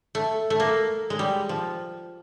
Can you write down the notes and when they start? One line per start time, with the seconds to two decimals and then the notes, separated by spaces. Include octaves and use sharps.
0.15 A3
0.50 A3
0.60 A#3
1.10 G#3
1.19 G3
1.49 F3